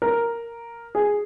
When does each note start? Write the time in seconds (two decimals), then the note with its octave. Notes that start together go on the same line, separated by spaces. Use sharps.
0.02 A#4
0.95 G#4